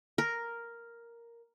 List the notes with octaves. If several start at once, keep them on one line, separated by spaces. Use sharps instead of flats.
A#4